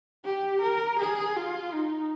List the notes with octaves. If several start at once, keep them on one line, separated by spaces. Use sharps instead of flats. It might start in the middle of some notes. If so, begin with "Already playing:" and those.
G4
A#4
G#4
F4
D#4